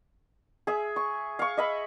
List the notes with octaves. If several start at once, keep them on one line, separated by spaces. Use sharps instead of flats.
G#4 E5
C#6
F5 C#6
D#5 E5 B5